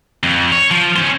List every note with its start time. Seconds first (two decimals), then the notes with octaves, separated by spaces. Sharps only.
0.23 F2
0.52 C#5
0.71 F3
0.96 C#4 C5